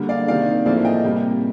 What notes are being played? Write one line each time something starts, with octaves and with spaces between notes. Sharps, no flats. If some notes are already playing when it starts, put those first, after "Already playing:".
Already playing: D3 G3 A#3
D5 F5
C3 D#3 A#3 D5 F5
A2 F3 A#3 D5 F5
D#5 G5
C3 G3 A#3